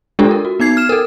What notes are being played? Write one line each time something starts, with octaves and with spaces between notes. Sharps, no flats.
G#3 D4 F4 G4 A4
A#4
F#4
B3 D#4 G#6 C7
F6 E7
A4 A#4